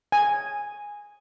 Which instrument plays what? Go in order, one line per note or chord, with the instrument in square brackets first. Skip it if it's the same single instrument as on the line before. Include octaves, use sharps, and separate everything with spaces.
[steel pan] G#5